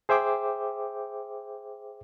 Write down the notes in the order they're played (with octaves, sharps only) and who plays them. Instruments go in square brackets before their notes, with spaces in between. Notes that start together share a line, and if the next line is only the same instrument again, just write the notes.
[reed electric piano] G#4 C5 E5 G5 D6